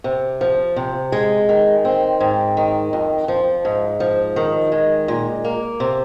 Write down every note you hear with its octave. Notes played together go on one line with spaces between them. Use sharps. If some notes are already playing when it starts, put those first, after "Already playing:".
C3
F3
C3
G#3
D#3
C4
G#2
D#3
F2
F3
G#2
F3
D#3
G#3
A#2
A#3
C3